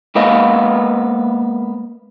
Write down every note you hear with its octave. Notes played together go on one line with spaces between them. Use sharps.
G#3 A#3 B3 B4 D#5 F5